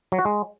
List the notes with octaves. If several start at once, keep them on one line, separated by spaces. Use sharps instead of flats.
F#3
F#4
G#3